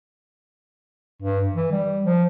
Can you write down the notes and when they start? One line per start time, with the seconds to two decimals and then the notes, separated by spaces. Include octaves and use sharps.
1.22 G2
1.54 E3
1.72 G3
2.06 F3